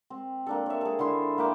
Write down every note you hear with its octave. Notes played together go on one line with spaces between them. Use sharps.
C4
A#3 D4 A4
C#5 E5
G#4 A4
D3 E4 C6
A#3 E5 G5 D6